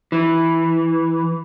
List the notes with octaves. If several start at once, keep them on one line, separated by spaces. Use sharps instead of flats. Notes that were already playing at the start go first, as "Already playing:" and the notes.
E3